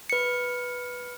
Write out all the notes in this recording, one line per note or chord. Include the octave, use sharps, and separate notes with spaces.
B4 C#7